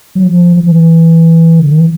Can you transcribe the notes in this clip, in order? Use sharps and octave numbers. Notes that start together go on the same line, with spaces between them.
F#3
F3
F3
E3
D3
D#3
E3